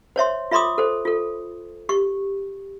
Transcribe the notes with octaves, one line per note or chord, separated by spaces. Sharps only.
C5 C#5 E5 C6
F4 E5 B5 C6 D6 D#6
A4 C5
F4 A4
G4 C#6